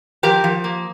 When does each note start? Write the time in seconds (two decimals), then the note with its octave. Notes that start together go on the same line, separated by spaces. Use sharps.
0.23 F3 G4 A#4
0.44 F3
0.64 A#3